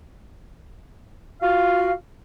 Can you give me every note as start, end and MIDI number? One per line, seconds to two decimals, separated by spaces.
1.42 1.92 65
1.42 1.92 66
1.42 1.92 77